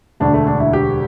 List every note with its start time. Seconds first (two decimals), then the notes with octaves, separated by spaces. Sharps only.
0.20 E1 D2 D3 D4
0.34 A3
0.47 D4
0.60 E4
0.73 G4